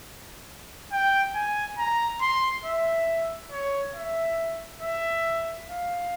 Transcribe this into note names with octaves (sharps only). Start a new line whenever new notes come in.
G5
G#5
A#5
C6
E5
C#5
E5
E5
F5